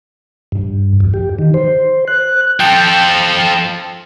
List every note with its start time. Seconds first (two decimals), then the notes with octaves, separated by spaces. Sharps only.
0.52 G2
1.00 F2
1.14 G4
1.39 D#3
1.54 C5
2.08 F#6
2.60 F3 A4 G5